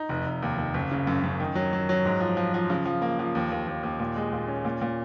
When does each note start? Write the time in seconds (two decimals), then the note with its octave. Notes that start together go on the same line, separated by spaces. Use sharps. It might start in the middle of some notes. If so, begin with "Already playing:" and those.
Already playing: D#4
0.09 F1
0.26 F1
0.43 D#2
0.58 D#2
0.74 F#1
0.91 C#3
1.07 F#2
1.23 F#2
1.40 D#3
1.55 F#3
1.73 F#3
1.89 F#3
2.05 G#2
2.20 F3
2.37 F3
2.54 F3
2.70 C#3
2.85 F3
3.02 A#3
3.19 F3
3.35 D#2
3.52 D#2
3.68 D#2
3.83 D#2
3.99 A#2
4.16 G#3
4.33 A#2
4.48 C#4
4.65 A#2
4.82 A#2